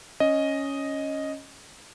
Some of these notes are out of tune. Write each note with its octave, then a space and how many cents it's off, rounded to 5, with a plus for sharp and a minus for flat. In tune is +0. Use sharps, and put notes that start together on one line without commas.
C#4 +0 D#5 +0